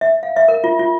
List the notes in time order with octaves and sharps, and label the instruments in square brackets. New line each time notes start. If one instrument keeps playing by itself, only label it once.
[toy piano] E5
F5
E5
A#4
F4
F4